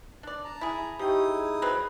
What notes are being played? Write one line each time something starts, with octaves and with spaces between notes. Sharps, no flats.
D4 D5
A5 A#5
E4 G#4
F3 D#4 E4 G4 G5 C#6 D#6
G#4
F#3 C4 B4